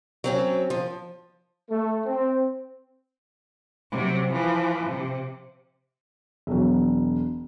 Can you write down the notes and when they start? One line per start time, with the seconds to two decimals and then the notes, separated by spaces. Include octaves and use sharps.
0.24 F#3 C4 C#4
0.70 F3
1.70 A3
2.06 C4
3.91 C3 F#3
4.32 E3 F3
4.87 C3
6.47 E1 F#3